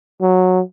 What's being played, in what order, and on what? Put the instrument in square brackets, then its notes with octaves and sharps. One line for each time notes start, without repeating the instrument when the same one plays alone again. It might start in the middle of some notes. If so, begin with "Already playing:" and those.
[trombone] F#3